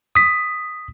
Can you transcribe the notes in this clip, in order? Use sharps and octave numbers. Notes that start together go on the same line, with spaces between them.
D#6 B6